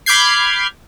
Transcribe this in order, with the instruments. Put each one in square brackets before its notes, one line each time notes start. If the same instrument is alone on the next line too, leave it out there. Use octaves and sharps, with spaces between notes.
[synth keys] B5 D6 F6 G6 G#6 C7